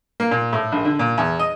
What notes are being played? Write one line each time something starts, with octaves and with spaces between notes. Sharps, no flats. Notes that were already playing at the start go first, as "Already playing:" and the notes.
A#3
A#2
A2
A#1
D3
A#2
E2
D#5